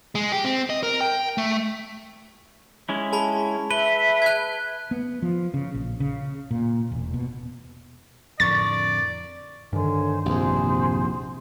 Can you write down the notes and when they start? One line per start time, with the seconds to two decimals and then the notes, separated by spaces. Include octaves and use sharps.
0.15 G#3
0.32 G4
0.45 C4
0.70 D#5
0.83 A#4
1.01 G5
1.38 A3
2.89 G#3 C#4 E4
3.13 G#4 A5 B5
3.71 B4 E5 G7
4.22 F#6 G#6
4.91 B3
5.22 F3
5.54 C#3
5.74 A#1
6.00 C#3
6.51 A#2
6.91 E1
7.14 B2
8.40 F2 A2 D3 A#4 D5 C#6 A6
9.73 G2 D3 D#3 C5 C#5 G#5
10.26 A#1 E2 C3 G#4 C5